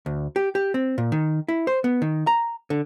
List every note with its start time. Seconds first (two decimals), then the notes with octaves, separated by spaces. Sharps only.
0.06 D2
0.36 G4
0.55 G4
0.74 C4
0.98 A#2
1.12 D#3
1.48 E4
1.67 C5
1.84 B3
2.02 D#3
2.27 A#5
2.70 D3